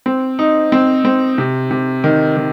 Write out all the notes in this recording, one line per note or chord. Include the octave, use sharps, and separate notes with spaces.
C4
D#4
C4
C4
C3
C3
D#3
D#3